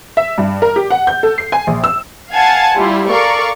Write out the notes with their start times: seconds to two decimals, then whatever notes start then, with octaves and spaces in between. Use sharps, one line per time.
0.17 E5
0.38 G2
0.62 A#4
0.76 G4
0.90 F#5
1.07 G6
1.23 A4
1.38 C7
1.52 G#5
1.67 A#1
1.84 E6
2.33 F5 F#5 G#5 A5 G#6 A6
2.76 G3 E4 F4
3.09 A4 A#4 D5 F5 C#6